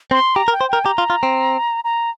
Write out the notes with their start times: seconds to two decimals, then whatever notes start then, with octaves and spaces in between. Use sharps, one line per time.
0.11 C4 C6
0.36 G4 A#5
0.48 A#4
0.53 G5
0.61 C5
0.68 A#4 G5
0.85 G4 A#5
0.98 F4
1.10 F4
1.23 C4
1.84 A#5